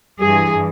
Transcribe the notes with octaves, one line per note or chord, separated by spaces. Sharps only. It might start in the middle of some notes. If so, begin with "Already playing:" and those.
G2 E3 G#4